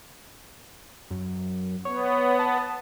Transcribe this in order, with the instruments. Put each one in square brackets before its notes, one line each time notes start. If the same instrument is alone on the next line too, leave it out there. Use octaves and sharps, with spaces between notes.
[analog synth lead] F#2
[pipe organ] B3 [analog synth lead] C#5
[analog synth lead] A5